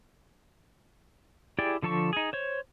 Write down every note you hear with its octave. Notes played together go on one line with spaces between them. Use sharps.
E4 G4 G#4 D5 G5
D3 F3 A4 A5 C#6
D#4 G#4
C5 C#5